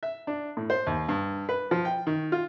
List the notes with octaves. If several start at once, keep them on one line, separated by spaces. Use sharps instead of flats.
E5
D4
A2
C5
D#2
G2
B4
F3
G5
D#3
F4